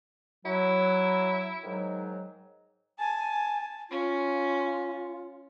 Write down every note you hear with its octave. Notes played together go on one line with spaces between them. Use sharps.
F#3 E4
G#2 D#3 F#3
G#5 A5
C#4 F4